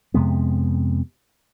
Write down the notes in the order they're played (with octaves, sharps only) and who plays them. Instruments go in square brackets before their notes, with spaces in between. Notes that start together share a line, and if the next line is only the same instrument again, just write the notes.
[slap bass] F2 C3 G#3 B3